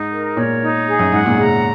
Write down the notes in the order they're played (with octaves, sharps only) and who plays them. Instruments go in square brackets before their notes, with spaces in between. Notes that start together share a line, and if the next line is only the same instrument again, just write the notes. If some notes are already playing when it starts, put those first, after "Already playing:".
Already playing: [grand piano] G#2 [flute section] D#4
[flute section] A#4
[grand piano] A#2 [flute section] C#5
[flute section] D#4
G#4
[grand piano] F#2
[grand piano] G#2 [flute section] F#5
[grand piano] A#2
[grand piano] C#3 [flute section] A#5